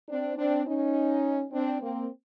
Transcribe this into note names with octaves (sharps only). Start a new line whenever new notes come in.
C4 D4
C4 D4
C#4 D#4
C4 D4
A#3 C4